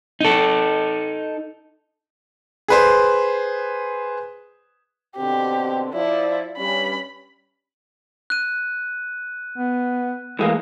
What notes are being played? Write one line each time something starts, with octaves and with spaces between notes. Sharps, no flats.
D#4 A4
G#4 B4 C5
B2 D3 C4 G4
F3 E4 D5
G2 G3 C#4 B5
F#6 D#7
B3
A2 E3 G#3 A#3